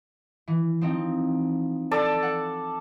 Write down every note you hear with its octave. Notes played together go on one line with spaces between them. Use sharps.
E3
F3 C4 D#4
A4 D5 A5
F#5